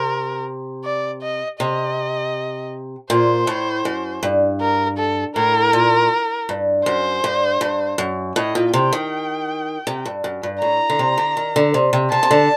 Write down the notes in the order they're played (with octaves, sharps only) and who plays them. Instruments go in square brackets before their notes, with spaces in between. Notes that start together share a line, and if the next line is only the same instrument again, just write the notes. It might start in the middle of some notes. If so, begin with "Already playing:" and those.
Already playing: [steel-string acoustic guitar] C3 [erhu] A#4
[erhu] D5
D#5
[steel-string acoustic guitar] C3 [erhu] D#5
[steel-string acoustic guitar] A#2 [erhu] C5
[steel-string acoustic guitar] A2
F#2
G2
[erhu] A#4
A4
[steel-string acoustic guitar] A2 [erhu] A#4
[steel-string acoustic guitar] A#2
G2
[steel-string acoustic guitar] F#2 [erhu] C5
[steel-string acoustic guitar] G2
G2
F#2
[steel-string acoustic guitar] A2 [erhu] D#5
[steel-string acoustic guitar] A#2
[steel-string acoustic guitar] C3 [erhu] G5
[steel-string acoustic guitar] D#3
C3
G2
F#2
G2
[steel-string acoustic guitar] A2 [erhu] A#5
[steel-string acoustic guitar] D3
C3
D3
D#3
D3
C3
C3
[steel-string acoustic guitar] C3 [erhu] A5
[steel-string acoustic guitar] C3
D3